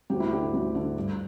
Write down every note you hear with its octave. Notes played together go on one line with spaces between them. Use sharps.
D2 G4
E4
D3 G4
D2
D3
G2